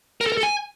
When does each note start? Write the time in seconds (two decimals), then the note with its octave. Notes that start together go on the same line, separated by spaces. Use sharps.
0.21 A#4
0.26 A4
0.32 A#4
0.37 A4
0.43 G#5